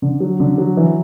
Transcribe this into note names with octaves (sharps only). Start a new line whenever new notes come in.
D3
F#3
D3
F#3
E3